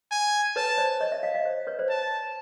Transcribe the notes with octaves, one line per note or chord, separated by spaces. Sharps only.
G#5
B4 C#5 A5
C5 D5
C#5 D#5
D5 E5
D#5 F5
D#5 F5
C5
B4 C#5
C5 D5
A5